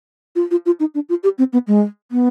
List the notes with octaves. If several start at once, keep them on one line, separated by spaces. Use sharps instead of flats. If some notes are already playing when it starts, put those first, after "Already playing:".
F4
F4
F4
D#4
D4
F4
G4
C4
B3
G#3
B3